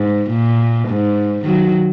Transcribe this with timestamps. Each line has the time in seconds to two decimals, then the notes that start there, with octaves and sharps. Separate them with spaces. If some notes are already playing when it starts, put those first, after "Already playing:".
Already playing: G#2
0.31 A#2
0.88 G#2
1.46 D#3 F#3